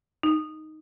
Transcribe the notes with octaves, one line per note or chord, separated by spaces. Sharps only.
D#4